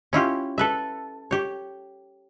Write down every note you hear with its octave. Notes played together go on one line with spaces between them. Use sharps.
C#4 E4 F4 G4
A4 B4 E5
G4 C#5